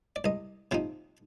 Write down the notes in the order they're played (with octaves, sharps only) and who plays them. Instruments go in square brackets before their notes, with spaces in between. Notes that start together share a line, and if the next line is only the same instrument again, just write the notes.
[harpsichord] D5
C2 D#5
C3 F3 C4 D#4